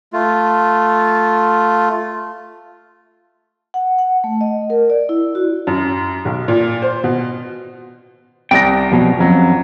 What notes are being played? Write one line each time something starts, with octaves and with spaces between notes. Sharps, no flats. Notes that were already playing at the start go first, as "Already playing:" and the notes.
A3 F4
F#5
F#5
A3
D#5
A#4
D5
E4
F#4
F#2
B1
A#2
C5
B2
C2 D5 G5 A#6
F2 B2 F#3
F2 C#3 F#3